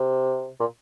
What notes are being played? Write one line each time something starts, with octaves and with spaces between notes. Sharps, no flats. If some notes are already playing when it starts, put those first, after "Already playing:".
Already playing: C3
A#2